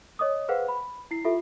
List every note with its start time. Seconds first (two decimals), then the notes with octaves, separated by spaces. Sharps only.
0.19 C#5 D#5 D6 D#6
0.49 G#4 B4 C5 F5 F#5
0.68 B5
1.11 E4 C7
1.24 F4 G4 A4 E5